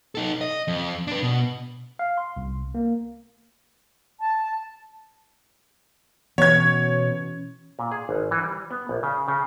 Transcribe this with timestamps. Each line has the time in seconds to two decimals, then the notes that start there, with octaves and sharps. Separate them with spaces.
0.15 D#4 A4
0.41 D#5
0.68 F2
1.07 D4 B4
1.22 B2
1.99 F5
2.18 C6
2.37 C2
2.75 A#3
4.20 A5
6.38 B2 E3 C#4 C#5 G#6
7.79 A#2
7.92 G#4
8.09 G#1
8.31 E3
8.43 G3
8.71 B3
8.89 A#1
9.03 C#3
9.28 C#3